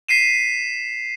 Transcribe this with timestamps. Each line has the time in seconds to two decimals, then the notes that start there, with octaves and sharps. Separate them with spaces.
0.09 B6 C7 D#7 E7